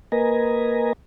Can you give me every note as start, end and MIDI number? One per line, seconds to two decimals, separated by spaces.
0.12 0.93 58
0.12 0.93 70
0.12 0.93 71
0.12 0.93 75
0.12 0.93 80
0.12 0.93 82